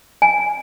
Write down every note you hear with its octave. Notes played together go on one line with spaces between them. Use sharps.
G#5